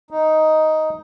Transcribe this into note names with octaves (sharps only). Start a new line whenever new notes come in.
D#4